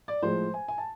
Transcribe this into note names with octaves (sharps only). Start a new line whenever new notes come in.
D5
A2 F3 G#3 C5
G#5
G#5
A5